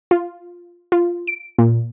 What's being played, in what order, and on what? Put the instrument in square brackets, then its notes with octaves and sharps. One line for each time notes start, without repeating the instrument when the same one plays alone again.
[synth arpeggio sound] F4
F4
D7
A#2